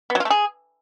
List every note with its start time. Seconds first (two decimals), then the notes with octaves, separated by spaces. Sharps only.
0.10 B3
0.15 F#3
0.20 F4
0.25 A3
0.30 G#4